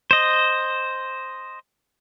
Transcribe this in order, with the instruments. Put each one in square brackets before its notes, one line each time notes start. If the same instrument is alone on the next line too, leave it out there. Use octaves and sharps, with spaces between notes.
[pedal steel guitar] C5 D#5